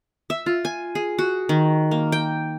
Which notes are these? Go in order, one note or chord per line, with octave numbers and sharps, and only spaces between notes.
E5
F4
G#5
G#4
F#4
D#3
A#3
G5